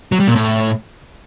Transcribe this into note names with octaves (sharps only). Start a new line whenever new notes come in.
F#3
G3
A#2
A2